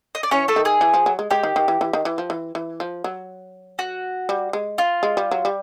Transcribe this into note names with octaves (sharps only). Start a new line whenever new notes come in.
D#5
D5
E3 C#4 C#5
A3 A4
D#3
G#4
E3
F3
F#3
G#3
G#3 G4
D#3
D#3
E3
E3
D#3
E3
F3
E3
E3
F3
F#3
F#4
G3
G#3
F4
G#3
G3
F#3
G3